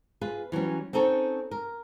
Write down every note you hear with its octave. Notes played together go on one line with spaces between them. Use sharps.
F4 G#4 B4
E3 F#3 G3 C#4
C4 C#4 D#4 A4 C#5
A#4